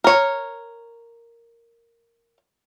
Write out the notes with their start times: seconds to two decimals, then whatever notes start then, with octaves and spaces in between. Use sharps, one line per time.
0.04 A#4 C#5